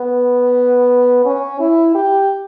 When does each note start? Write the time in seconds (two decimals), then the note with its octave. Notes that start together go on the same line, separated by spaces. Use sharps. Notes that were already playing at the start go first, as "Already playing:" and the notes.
Already playing: B3
1.26 C#4
1.60 E4
1.95 G4